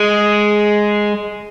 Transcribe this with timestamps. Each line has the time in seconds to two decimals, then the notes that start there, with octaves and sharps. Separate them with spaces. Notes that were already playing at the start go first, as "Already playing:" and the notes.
Already playing: G#3